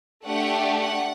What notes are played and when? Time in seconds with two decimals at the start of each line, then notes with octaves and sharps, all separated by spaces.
0.25 A3 D4 G4 F#5
0.78 F#5